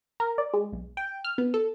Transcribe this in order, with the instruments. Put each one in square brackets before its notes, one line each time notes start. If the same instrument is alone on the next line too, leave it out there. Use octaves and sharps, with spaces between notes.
[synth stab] A#4
D5
G#3
B1
G5
F6
B3
A4